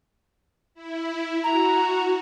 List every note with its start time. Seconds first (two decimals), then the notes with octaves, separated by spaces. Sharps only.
0.74 E4
1.44 F#4 A#5